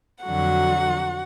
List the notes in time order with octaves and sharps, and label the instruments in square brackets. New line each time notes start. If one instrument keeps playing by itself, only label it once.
[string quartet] F2 D3 F#3 F#4 F#5